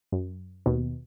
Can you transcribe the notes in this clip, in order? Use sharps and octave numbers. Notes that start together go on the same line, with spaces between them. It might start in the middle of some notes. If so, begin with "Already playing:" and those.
F#2
D#2 B2